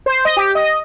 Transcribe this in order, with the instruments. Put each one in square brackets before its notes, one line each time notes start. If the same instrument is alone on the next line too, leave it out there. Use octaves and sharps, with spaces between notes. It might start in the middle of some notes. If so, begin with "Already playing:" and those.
[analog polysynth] C5
D#5
G4
D#5